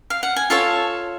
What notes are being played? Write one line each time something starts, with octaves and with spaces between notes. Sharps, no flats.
F5
F#5
G#5
F4 A4 C#5 A5